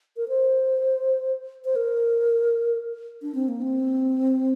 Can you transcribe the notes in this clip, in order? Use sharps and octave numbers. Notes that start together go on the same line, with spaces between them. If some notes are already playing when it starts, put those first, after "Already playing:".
A#4
C5
C5
A#4
D4
C4
A#3
C4